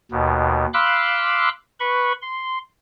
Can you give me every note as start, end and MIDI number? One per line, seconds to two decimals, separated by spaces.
0.11 0.65 39
0.11 0.65 47
0.74 1.49 77
0.74 1.49 83
0.74 1.49 84
0.74 1.49 86
0.74 1.49 88
0.74 1.49 90
1.80 2.12 71
1.80 2.12 83
1.80 2.12 85
2.22 2.58 84